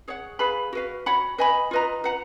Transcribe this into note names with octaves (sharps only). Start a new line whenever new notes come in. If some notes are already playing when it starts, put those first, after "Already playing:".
G#4 C#5 F#5
G#4 B4 F5 B5
F#4 B4 F5
F#4 C#5 F#5 B5
B4 D#5 G#5 B5
F4 B4 D#5 A#5
B4 F#5 A#5